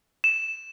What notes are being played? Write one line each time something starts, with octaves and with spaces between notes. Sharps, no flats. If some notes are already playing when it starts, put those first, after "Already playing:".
E7